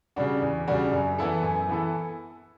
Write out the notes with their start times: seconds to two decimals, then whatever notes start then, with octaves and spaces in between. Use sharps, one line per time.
0.16 C#3 G3 D4 F#4
0.42 E2
0.68 C#3 G3 D4 F#4
0.92 F#2
1.18 E3 B3 E4 A4
1.43 F#2
1.69 E3 B3 E4 A4